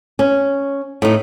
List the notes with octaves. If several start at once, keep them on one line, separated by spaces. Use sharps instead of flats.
C#4
A2 D#4